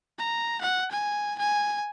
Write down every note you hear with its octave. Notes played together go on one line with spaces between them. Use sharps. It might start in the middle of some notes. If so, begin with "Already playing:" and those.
A#5
F#5
G#5
G#5